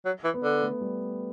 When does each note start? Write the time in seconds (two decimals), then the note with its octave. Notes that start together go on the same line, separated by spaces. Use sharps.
0.05 F#3
0.24 E3
0.34 B3
0.43 D3
0.62 A3
0.81 G3